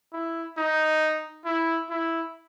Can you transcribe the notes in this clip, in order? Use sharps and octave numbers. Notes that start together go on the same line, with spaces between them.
E4
D#4
E4
E4